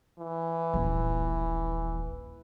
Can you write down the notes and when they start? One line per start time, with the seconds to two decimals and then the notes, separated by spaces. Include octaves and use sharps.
0.19 E3
0.74 D#1 A#1